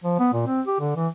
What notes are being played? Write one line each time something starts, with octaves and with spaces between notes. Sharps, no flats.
F3
B3
A#2
C4
G4
D3
E3